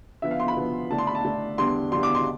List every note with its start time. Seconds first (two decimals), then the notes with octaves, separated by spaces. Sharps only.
0.22 D3 F3 B3 E5
0.31 F5
0.40 C6
0.48 B5
0.56 D3 F3 B3
0.90 D3 A3 D4 A5
0.98 C6
1.07 B5
1.15 A5
1.24 D3 A3 D4
1.58 E2 D3 G3 D4 C6
1.92 E2 D3 G3 D4 C6
2.03 D6
2.15 C6